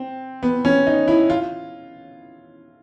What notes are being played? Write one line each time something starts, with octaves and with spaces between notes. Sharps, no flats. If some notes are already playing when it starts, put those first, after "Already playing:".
Already playing: C4
B3
C#4
D#4
E4
F4